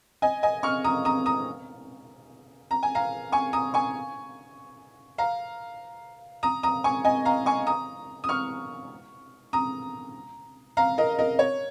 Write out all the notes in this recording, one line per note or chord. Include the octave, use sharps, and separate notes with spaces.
D#5 G#5
D#5 G#5
C#6 F6
A#5 D#6
A#5 D#6
A#5 D#6
A#5
G#5
F5 A#5
G#5 C#6
A#5 D#6
G#5 C#6
F5 A#5
A#5 D#6
A#5 D#6
G#5 C#6
D#5 G#5
F5 A#5
G#5 C#6
A#5 D#6
D#6
C#6 F6
A#5 D#6
F5 A#5
A#4 D#5
A#4 D#5
C#5